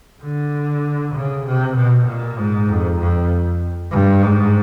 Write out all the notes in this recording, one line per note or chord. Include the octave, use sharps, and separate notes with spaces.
D3
C#3
C3
B2
A#2
G#2
F2
F2
G2
G#2